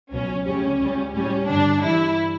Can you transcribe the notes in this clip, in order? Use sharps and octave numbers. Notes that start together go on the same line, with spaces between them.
C#2 B2 F#3 C#4
D2 C#3 G3 C#4
C#2 C#3 G3
A2 G3 C#4
G2 D3 G3 D4
G2 E3 G3 E4